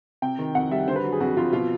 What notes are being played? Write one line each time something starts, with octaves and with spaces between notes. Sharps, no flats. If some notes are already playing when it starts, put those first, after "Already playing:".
C3 G5
D#3
F2 F#5
G3 E5
D3 C5
B4
F#3
G#4
F2 F#4
F2 F4
B2 F4